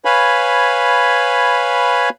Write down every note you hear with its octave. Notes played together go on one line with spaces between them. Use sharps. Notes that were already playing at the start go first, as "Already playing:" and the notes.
B4 C#5 F5 G#5 B5